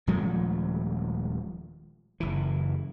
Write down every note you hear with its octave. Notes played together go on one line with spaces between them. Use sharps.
D#1 F3 G#3 A3
F#1 E3